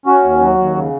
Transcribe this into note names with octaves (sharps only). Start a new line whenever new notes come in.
C#4 F#4
D#2
F#3
D#2
C#3